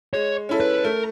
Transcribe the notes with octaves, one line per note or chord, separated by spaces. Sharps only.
G#3 C#5
C#4 E4 A4
B4
A3 A#4